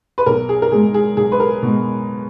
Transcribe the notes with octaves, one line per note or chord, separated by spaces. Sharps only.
B4
B1 A#4
G#4
A#4
B2 G#3 G#4
G#4
B1 G#4
B4
A#4
B2 G#3